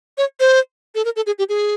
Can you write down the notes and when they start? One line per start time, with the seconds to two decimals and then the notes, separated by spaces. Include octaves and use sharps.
0.18 C#5
0.40 C5
0.95 A4
1.05 A#4
1.16 A4
1.26 G#4
1.39 G4
1.49 G#4